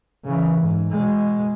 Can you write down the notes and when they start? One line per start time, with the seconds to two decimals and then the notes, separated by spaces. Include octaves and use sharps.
0.25 C#3 E3
0.60 G#2
0.90 B2 G#3